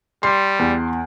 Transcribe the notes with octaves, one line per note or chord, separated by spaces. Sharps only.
G3 C6
E2